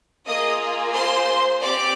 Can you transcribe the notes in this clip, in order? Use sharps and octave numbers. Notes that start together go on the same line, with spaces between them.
A#3 F4 G#4 D#5 D#6
C5 C6
C4 G4 D5 D6